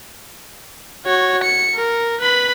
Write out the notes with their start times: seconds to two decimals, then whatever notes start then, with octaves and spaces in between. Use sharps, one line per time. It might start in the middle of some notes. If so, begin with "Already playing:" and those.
1.05 F#4 C#5
1.43 C#7
1.75 A#4
2.21 B4 B5